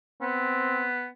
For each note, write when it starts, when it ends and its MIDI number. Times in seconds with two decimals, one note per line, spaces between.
0.21 1.08 59
0.21 0.88 60